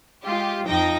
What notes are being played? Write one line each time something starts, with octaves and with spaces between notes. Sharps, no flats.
G#3 F4 G4
F2 F3 D#4 G5 A#6